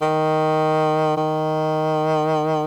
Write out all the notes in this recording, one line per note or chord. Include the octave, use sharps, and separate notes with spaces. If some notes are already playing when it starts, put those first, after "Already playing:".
D#3
D#3